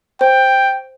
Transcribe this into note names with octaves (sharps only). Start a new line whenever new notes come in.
C5 G5